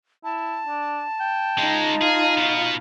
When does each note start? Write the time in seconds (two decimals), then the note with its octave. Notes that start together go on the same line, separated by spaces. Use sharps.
0.24 E4 A5
0.67 D4
1.20 G5
1.58 C#3 G#3 D#4 F4
2.02 G#4 F5
2.37 B2 B3